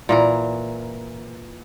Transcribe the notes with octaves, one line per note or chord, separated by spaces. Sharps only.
A#2 E3 A#4